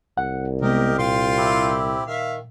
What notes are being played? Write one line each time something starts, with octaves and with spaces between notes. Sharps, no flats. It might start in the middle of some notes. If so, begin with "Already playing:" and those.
C2 F#5
C3 G#3 B3 G4 A#4 D#5
A#2 F4 G5 C6
C4 E4 G4
D#3 E5 F5